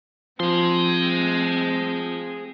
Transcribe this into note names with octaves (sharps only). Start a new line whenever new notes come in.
F3 C4 G#4 C6